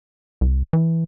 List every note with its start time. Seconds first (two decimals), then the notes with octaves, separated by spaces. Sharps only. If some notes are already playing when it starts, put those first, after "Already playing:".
0.41 C2
0.73 E3